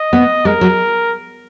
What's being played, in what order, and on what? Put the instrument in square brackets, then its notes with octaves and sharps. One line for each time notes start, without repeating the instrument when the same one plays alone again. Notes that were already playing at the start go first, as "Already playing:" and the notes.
Already playing: [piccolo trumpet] D#5
[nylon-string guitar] B3
[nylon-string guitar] G#3 [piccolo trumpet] A#4
[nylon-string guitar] F#3